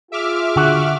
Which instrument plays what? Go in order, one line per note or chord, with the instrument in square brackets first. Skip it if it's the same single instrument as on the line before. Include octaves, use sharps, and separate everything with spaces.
[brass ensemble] F4 G#4 [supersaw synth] E5 D6 F6
[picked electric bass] D3 [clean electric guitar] F#4